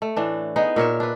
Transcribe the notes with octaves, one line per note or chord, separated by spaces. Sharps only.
A3
A2 E3 D4
B3 D#4 G#4
A#2 A#4 C#5 E5
D4 B4